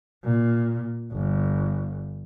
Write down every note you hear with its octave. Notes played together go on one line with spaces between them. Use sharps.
A#2
G1